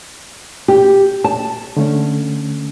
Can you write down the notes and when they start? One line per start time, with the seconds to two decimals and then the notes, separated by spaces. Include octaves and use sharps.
0.68 G4
1.24 A5
1.77 D3 A3 C#4